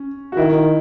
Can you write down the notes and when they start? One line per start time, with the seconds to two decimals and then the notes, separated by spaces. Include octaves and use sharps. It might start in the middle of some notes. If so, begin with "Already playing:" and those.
Already playing: C#4
0.32 F#4
0.37 D#3 E4